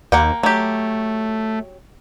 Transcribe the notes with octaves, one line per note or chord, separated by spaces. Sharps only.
D#2 A#3 F#5 G5
F#3 A3 G4